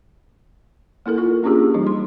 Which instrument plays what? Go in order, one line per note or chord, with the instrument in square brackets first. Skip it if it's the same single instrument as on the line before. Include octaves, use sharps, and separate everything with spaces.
[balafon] A#3 E4 A4 A#4
F4
A#3 C#4 D4 F4 G4 G#4
E3 G3 D#4
C6